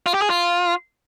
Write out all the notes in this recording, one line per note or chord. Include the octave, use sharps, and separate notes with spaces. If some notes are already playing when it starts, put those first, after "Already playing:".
F4
G4
G#4
F4